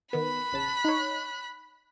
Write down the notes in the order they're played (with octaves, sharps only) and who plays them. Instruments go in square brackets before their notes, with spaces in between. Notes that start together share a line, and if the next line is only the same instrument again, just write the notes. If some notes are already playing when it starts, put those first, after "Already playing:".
[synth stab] D#3 B3 [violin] B5 F#6
[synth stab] A#1 C#3 A5
D#4 C#5